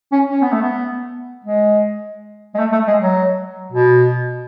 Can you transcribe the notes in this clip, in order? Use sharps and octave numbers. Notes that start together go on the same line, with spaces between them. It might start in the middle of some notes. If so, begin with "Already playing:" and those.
C#4
C#4
B3
A3
B3
G#3
G#3
A3
A3
G#3
F#3
B2